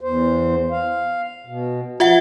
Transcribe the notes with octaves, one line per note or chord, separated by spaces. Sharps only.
E2 C5
F5
B2
F3 F4 E5 F#5